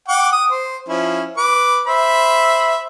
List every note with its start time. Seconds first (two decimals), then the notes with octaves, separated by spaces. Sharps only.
0.08 F#5 G5 D6
0.32 D#6
0.50 C5
0.88 F3 C#4 E4
1.37 B4 D6
1.87 C5 E5 B5